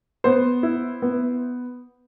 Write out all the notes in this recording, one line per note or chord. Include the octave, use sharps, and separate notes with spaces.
B3 C5
E4
B3